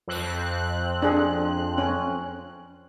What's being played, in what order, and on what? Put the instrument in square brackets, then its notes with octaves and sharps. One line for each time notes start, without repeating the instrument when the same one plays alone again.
[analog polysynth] F2 C4 F#6
[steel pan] D4 G#4
C#4